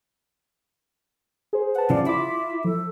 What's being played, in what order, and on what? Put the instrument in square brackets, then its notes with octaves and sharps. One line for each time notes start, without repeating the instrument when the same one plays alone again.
[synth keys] G#4 C5
[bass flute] B4 [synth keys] F#5 A5
[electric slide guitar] C#3 F3 [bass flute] D5
[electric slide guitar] E4 [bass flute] F4 [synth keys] D6 B6
[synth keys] F3 [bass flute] A4